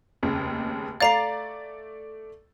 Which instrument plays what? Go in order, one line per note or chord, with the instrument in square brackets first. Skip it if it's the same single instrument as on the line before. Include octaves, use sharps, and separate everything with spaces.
[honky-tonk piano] F1 D#2 C#3
[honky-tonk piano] A3 D5 A6 [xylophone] F5 A#5 C7